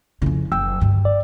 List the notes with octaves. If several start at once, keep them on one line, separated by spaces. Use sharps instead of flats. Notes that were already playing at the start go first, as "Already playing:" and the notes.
F2 C#3 C#4 E4
F#1 G5 E6
D2 G2
D5